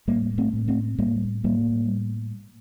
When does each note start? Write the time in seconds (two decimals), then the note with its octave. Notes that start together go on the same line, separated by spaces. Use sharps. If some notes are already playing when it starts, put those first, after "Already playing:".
0.08 A2 G3 A#3
0.38 A3 C4
0.53 A2
0.68 A3 C4
0.98 A2 G3 A#3
1.44 A2 G3 A#3